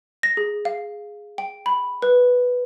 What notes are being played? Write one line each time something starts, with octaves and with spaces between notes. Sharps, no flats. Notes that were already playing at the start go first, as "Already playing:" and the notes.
A#6
G#4
F5
G5
B5
B4